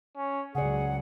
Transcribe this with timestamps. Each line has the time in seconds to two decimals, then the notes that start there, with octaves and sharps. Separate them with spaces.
0.16 C#4
0.55 C#2 C#3 F#3 G#4 D5 F#5